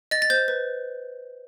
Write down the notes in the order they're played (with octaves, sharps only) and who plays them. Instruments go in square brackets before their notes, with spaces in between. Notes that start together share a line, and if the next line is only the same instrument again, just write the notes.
[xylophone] D#5 A6
A6
C5 G6
B4